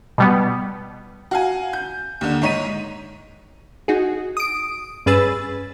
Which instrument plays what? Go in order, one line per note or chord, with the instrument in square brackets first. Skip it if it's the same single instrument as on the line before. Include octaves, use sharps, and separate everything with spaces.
[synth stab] B2 G3 B3
[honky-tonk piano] F#4 F5 G#5
G6
D#2 D3
G#2 D#4 C#5 B6 D#7
[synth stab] D#4 F#4 G#4
D#6 D7
G2 C#4 G#4 B4 E6 A6